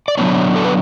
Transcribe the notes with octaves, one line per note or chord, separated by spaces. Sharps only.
D5
D3 F#3 B3 D4 C#5
A4
B4